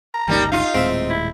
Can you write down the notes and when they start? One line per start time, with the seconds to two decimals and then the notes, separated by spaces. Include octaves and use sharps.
0.14 A#5
0.28 G1 C#2 G3 A#3 D#4
0.52 D#4 F4 F5
0.74 D#1 A2 G#3 C4 E5
1.10 E4